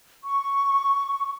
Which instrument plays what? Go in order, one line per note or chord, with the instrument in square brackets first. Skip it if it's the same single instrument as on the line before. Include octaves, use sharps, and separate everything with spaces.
[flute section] C#6